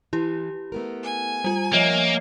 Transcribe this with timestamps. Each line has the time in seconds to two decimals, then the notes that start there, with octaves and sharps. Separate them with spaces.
0.13 E3 E4 G4
0.72 A3 B3 A#4
1.04 G#5
1.44 G3 F4
1.73 F3 A#3 C#5 D#5 E5